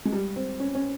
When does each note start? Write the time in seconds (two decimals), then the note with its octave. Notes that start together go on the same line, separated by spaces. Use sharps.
0.05 G#3
0.12 G3
0.36 C4
0.60 C#4
0.75 C#4